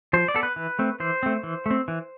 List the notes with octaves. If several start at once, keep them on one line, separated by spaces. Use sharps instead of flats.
F3 C5
D5
B3 A4
B4
E3
A3 C4
E3 C5
A3 C4
E3
A3 C4
E3